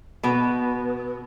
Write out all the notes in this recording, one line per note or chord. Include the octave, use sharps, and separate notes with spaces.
B2 B3